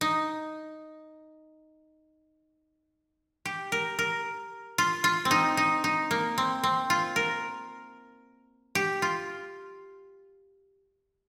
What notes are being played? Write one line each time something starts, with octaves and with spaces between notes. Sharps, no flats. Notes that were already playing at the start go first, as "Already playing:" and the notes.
D#4
G4
A#4
A#4
F4
F4
C4
D#4
D#4
D#4
A#3
C4
C4
F4
A#4
G4
F4